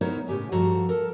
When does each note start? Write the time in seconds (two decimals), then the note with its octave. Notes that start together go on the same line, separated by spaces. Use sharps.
0.01 B3 D#4 E4 A#4 C5 C#5
0.28 A2 C#3 G4 G#5
0.52 G2 F3 F#4 A4 C5 A#5
0.89 A4 A#4